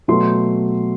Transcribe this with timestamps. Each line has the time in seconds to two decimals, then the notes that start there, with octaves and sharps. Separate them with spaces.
0.08 B2 F#3 A3 C6